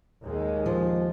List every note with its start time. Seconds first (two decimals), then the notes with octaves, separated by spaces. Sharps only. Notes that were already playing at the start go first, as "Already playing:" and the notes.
0.24 D#2 G#3
0.66 F3